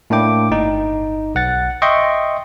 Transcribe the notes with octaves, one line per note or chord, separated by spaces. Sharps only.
A2 A#3 D4 E4 G5 D6
G1 D#4
B1 F#5 A6
D#5 E5 G5 C6 C#6